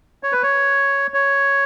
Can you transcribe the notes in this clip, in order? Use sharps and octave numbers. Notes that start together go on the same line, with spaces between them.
C#5
B4
C#5
C#5